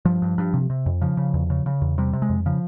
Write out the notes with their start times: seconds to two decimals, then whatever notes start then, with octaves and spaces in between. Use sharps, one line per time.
0.05 G2 F3
0.22 G2
0.38 G2
0.54 C3
0.70 C3
0.86 F2
1.01 C#3 F3
1.17 C#3
1.34 E2
1.50 C#3
1.66 C#3
1.82 E2
1.98 C3 G3
2.13 C3
2.22 G#3
2.30 F2
2.46 C#3 F3